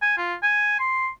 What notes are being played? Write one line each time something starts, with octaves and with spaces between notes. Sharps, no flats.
G#5
F4
G#5
C6